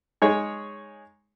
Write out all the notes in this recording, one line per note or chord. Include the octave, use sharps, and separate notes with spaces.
G#3 D#4 G#4 C#5